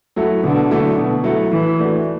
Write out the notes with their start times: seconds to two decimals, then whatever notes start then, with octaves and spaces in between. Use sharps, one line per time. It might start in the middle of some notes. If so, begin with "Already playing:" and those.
0.16 F#3 A3 E4 A4
0.43 B2 D3
0.70 F#3 A3 E4 A4
0.98 B2
1.24 F#3 A3 E4 A4
1.51 A2 E3
1.78 E3 A3 D4 F#4